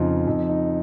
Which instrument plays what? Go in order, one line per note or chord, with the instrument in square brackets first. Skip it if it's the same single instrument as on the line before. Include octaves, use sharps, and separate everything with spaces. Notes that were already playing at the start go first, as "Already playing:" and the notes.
Already playing: [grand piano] F2 C#3 D#4 F4
F2 D#4
D#4